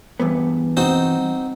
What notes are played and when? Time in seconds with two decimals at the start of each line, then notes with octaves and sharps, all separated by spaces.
0.20 E2 G2 B3
0.77 C4 D#4 F#4